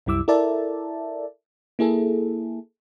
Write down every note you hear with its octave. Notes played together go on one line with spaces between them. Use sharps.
C2 F#2 G3 E4 D6 E6
E4 A4 A#4 D5 E5 A5
A#3 E4 G#4 A4